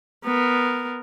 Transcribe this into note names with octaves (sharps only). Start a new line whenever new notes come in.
B3 A#4